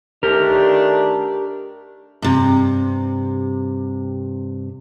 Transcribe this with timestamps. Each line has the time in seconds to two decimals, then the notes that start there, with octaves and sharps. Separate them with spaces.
0.23 D#3 A3 D4 G4 A#4
2.22 G2 C3